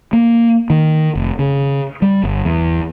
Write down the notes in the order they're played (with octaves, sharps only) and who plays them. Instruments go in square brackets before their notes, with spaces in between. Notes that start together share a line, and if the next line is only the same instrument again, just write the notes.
[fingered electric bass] A#3
D#3
F1
C#3
G3
G1
E2